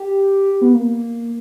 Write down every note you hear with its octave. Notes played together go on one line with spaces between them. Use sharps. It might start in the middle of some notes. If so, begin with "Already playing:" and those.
Already playing: G4
B3
A#3